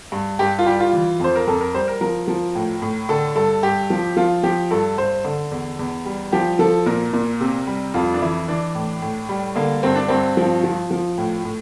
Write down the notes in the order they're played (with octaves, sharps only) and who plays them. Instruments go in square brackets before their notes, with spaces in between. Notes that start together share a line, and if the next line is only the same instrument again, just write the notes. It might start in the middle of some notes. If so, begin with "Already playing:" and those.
[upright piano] G2
G2 G4
F4
G3 G4
F4
E3
F2 C5
A#4
F2 A4
A#4
G3 C5
A#4
F3 A#4
F3
A2
A2
D3 A4
G2 A4
G2 G4
F3
F3 F4
F3 G4
G2 A4
G2 C5
D3
E2
E2
G3
F3 G4
F3 A4
A#2 A#4
A#2
C3
G3
F2 F4
D4
E3 E4
E3 D4
A2
A2
G3
D3 A#3
G2 C4
D4
G2 C4
F3
F3
F3
A2
A2